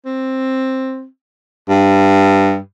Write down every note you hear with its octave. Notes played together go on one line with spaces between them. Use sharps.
C4
G2